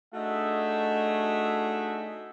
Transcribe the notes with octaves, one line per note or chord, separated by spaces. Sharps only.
A3 D4 D#4 F#4 G#4 E5